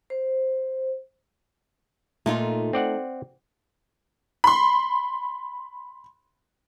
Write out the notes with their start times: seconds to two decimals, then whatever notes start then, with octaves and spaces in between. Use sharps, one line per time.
0.10 C5
2.26 A#2 A3 D#4 F4
2.73 C4 D5 F#5
4.44 B5 C6